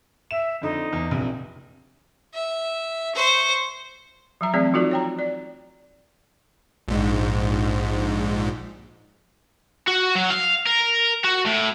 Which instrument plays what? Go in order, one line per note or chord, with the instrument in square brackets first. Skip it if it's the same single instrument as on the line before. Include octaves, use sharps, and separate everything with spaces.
[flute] E5 [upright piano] E7
[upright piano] F2 D3 [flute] D#4
[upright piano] E2
F1 A#1 C3
[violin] E5
C5 C#6
[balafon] F3 F#3 A#5
E3 F#3 A3 C4 G#4 D5
F3 D#4 F4 F#4 A4 D5
C#5 G5 A#5
D5
[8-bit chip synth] A#1 G#2
[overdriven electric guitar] F#4
F#3
F5
A#4
F#4
A2